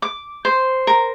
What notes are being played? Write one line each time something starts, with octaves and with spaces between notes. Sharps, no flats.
D6
C5
A#4